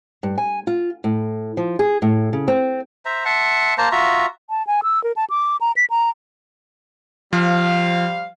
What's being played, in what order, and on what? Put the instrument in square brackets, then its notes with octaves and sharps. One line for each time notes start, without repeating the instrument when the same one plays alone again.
[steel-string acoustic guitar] G2
G#5
F4
A2
F3
G#4
A2
C#3
C4
[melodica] C5 E5 A#5
E5 F#5 A5 C6
A#3 C5 A5 A#5
F4 F#4 E5 A#5
[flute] A5
G#5
E6
A#4
A5
D6
A#5
B6
A#5
[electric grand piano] F3 [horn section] G3 C5 F5